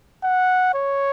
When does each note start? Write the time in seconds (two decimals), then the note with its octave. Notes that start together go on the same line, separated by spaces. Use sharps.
0.24 F#5
0.75 C#5